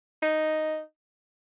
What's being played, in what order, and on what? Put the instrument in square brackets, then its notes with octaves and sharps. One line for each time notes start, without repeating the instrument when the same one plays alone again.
[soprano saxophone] D#4